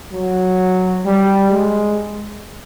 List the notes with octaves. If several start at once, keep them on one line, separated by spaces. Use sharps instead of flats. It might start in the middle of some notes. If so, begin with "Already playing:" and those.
F#3
G3
G#3